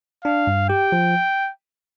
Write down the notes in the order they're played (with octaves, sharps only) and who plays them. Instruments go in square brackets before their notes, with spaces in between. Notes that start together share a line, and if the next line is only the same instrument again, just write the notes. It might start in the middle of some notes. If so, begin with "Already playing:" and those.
[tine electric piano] D4 [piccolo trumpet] F5
[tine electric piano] G2
[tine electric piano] G4 [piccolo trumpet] G5
[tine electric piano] F3